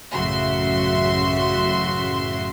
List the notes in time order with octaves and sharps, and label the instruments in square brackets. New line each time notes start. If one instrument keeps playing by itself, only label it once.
[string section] A1 F#2 C#3 F#4 E5 C6